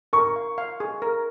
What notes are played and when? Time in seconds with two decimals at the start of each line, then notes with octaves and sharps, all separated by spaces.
0.13 A#4 C#6
0.36 F5
0.58 F5
0.80 G#4
1.02 A#4